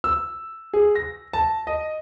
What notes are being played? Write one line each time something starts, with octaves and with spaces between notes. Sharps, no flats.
E6
G#4
A#6
A5
D#5